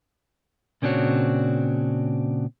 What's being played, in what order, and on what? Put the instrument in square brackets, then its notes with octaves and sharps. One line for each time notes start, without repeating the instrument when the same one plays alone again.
[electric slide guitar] A#2 C#3 C4 D4 F#4 C#5